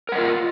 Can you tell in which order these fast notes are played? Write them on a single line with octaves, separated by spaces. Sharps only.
A#4 F#5 D#5 F4